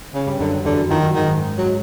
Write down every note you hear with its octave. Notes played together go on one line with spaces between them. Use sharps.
C#3
G2 G3
F#2 D3 F#3
E2 D3 E3
F2 D#3 F3
F#2 F#3
G#2 D#3 G#3
G#2 G#3
F#3